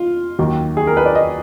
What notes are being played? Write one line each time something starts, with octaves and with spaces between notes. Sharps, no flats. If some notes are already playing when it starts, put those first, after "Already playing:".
Already playing: F4
D#2 D#3 F#3
G#4
A#4
B4
D5
D#5